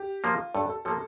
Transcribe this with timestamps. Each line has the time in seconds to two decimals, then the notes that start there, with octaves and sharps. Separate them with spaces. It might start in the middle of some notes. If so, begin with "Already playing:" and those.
Already playing: G4
0.24 F3 A#3 F4
0.55 G2 A4
0.69 A4
0.85 F3 A#3 A4